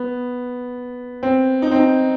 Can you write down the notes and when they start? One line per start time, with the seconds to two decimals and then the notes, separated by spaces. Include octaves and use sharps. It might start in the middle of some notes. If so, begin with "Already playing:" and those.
Already playing: B3
1.23 C4
1.62 D#4
1.71 C4
1.79 D#4